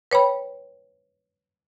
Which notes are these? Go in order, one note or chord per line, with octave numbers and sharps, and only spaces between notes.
B4 C#5 G5 B5